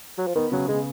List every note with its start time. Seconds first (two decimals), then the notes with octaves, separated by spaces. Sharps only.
0.18 F#3
0.27 F3
0.35 D#3 B3
0.52 C#3 F#3
0.68 C#3 G#3